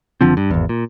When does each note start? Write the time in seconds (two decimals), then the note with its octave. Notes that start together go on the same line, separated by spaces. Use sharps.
0.21 F#1 D3 F3 C4
0.37 G2
0.50 G#1 E2
0.69 A#2